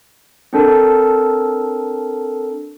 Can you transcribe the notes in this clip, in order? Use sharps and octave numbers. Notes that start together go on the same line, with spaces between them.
C4 D4 A4 A#4